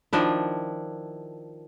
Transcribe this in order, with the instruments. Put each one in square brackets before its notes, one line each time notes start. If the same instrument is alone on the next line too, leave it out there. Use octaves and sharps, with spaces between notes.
[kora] D#3 F3 D4 E4